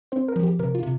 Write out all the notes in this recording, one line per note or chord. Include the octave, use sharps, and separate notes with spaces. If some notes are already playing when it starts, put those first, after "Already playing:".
C4 C5
A#4
F3
G4
C3 A#4
F4
C3